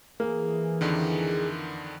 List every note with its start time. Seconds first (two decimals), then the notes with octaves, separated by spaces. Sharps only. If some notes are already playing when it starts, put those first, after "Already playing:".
0.20 E3 A#3 G#4
0.81 F2 D3 D#3